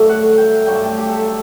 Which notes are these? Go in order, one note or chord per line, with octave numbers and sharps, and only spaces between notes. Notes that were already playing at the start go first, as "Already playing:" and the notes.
Already playing: G2 D3 F#3 A3 E5
F#5
G5
G2 D3 F#3 A3 G5
A5
G5
G4
A4